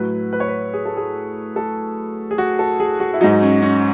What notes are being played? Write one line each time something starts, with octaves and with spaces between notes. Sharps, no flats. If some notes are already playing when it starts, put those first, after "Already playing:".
Already playing: A2 F#3 B4
B4
C#5
B4
G#4
A4
G#4
A4
G#4
F#4
A4
G#4
F#4
E4
G#2 F#3 D#4
C#4
C#4